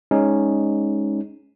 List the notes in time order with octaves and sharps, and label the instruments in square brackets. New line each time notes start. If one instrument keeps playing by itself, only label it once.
[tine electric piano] G#3 C#4 D#4